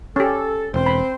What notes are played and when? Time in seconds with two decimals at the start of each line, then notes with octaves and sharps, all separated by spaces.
0.16 C#4 G4 A4
0.74 E1 C4 C5
0.86 B5